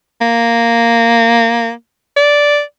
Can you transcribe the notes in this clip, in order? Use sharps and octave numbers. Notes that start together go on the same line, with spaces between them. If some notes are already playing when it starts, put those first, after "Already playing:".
A#3
D5